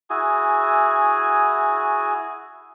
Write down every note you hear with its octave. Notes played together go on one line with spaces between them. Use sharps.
E4 F#4 G#4 G#5